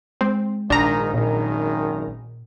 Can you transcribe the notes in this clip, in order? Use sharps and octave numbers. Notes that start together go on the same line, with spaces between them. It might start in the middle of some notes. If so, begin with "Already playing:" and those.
G#3 C4
A#1 G#2 D#3 D4 A#5
G#1 F#2 A#2 D#3